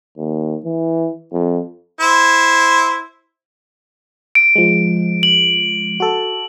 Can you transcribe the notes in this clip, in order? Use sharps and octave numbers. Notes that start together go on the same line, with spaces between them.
D#2
E3
F2
E4 C5
D7
F3 G#3
F#7
F#4 A4